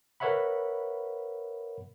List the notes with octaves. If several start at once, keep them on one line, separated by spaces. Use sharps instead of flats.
A#4 B4 C#5 E5 F#5 B5